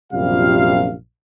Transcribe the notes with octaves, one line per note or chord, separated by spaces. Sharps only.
A#1 F#2 C3 G3 F4 F5